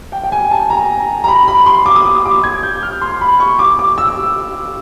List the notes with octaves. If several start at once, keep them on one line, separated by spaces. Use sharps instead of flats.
G5
G5
G#5
A5
A#5
A#5
B5
B5
C6
D6
D#6
D6
D#6
D6
G#6
G6
F6
C6
B5
C#6
D6
D6
E6